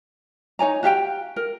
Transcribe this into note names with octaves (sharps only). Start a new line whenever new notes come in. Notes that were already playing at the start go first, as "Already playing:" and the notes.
D#4 C#5 G#5 A#5
F#4 G4 F5 G5
A#4